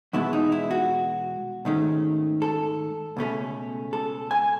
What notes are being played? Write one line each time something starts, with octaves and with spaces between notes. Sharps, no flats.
E2 B2 G#3 B3 E4
D#4
E4
F#4
G#2 D#3 A3 C#4
A4
C#2 B2 A3 C#4
A4
G#5